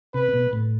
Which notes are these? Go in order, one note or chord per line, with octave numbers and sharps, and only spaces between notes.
C3 B4
B2
A2